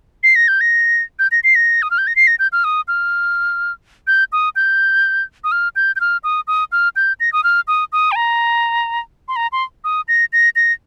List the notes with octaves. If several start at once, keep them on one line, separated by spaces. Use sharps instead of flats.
C7
A#6
G6
A#6
G6
A#6
C7
A#6
D#6
F6
G6
A#6
C7
A#6
G6
F6
D#6
F6
G6
D#6
G6
D#6
F6
G6
G6
F6
D#6
D#6
F6
G6
A#6
D#6
F6
D#6
D#6
G5
A#5
C6
A#5
C6
D#6
A#6
A#6
A#6